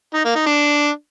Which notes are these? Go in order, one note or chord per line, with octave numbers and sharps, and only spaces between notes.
D#4
A#3
D#4
D4